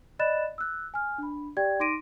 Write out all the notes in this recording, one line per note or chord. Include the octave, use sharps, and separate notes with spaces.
D5 D#5 B5 F#6 A6 E7
E6 F#6
G#5 F6
D4 B5
G4 D5 G5 G#6
D#4 C6 D6 A#6 D7 D#7